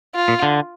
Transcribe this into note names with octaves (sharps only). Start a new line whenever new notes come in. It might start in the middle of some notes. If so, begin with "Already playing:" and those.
F4
A#2
D3